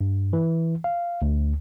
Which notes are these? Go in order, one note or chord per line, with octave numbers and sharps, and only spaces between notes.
G2
E3
F5
D2